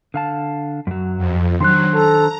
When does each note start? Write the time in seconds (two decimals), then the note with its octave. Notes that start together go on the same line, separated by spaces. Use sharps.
0.14 D3 F5 A5
0.87 F#2 F#3
1.17 F2
1.61 D#3 F#3 D4 C5 C6 F#6
1.95 A4 A#5